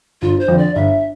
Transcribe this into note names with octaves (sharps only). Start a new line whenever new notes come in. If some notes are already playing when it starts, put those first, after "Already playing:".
G1 F4
C5
F2 D3
D5
G1 E5